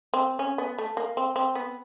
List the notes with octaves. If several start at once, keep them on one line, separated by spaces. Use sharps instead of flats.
C4
C#4
B3
A3
A#3
C4
C4
B3